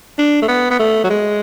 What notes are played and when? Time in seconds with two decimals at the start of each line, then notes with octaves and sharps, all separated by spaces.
0.19 D4
0.42 A3
0.48 B3
0.71 B3
0.79 A3
1.04 F#3
1.10 G#3